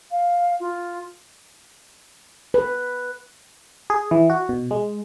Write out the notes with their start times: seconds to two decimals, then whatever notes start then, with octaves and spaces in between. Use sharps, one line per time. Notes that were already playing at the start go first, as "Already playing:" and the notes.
0.11 F5
0.60 F4
2.54 B4
3.90 G#4
4.11 E3
4.30 F#4
4.49 B2
4.71 G#3